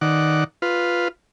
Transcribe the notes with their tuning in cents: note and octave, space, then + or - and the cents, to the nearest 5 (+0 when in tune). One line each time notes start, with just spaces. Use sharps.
D#3 +0 D5 -5 F#5 +0
F4 +0 B4 +0